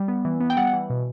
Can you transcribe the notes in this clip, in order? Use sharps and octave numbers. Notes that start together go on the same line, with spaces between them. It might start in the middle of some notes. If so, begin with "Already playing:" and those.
Already playing: G3
B3
E3
B3
G5
G3 F#5
E3
B2